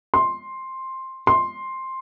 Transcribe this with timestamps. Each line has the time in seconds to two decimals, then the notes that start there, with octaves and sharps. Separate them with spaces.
0.14 C6
1.27 C6